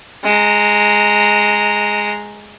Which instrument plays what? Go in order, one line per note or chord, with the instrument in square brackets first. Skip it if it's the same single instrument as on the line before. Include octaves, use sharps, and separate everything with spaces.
[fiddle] G#3 A#5